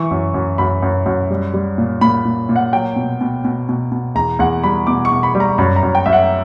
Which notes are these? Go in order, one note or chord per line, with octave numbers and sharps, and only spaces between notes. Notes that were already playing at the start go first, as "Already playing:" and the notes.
Already playing: E3 C#6
F#2
F#2
F#2 B5
F#2
F#2
G3
G3
A#2
A#2 B5
A#2
A#2
F#5
F#3 G5
B2
B2
B2
B2
B2
E2 A#5
E2 F#5
G3 B5
B2 D6
C#6
B2
B5
G3
A#5
F#2 B5
A#5
F#2
G5
F#2 E5
F#5